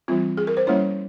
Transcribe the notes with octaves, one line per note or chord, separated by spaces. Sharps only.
E3 G3 C4 F4
G#4
A#4
C5
G3 A#3 C#4 E4 C#5